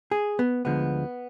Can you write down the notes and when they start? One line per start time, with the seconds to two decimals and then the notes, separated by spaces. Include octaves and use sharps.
0.11 G#4
0.39 B3
0.65 D2 D3 F3 G#3 B3